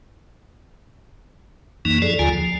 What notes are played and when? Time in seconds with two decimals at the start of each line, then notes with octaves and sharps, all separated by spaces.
1.85 F#2 E3 A#3 D#4
2.02 F3 G#4 A4 D5
2.19 D#2 D3 F4 G#5
2.33 F3